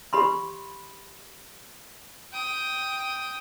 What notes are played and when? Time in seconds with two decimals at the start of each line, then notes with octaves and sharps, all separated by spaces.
0.13 G4 B5 C6
2.33 G5 D#6